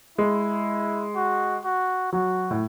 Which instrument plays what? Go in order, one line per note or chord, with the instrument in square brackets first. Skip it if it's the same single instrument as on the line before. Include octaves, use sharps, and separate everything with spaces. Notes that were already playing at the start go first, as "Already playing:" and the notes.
[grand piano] G#3 [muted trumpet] E4
[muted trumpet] F#4
F#4
[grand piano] F#3 [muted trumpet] F#4
[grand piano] A2